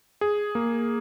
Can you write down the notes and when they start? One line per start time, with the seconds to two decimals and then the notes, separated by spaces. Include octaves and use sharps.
0.21 G#4
0.55 A#3